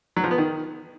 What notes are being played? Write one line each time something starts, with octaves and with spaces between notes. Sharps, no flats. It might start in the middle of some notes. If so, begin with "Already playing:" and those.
F#3
F3
B3
D#3